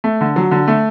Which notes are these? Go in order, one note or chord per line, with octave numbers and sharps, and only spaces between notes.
A3
D3
F#3
D3
A3